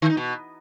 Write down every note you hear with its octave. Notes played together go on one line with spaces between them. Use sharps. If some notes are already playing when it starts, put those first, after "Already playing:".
D#3
D#4
B2